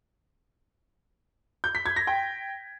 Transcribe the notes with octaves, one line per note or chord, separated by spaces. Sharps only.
G6
B6
G#6
A#6
G5